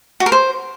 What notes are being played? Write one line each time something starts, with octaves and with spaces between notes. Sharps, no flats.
F#4
A#4
C5